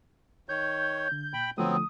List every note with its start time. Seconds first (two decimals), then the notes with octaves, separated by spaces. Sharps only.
0.49 D#3 C#5 G6
1.12 D3
1.33 A#2 G5 B5
1.58 D3 F3 F#3 A3 B3 C4 D#6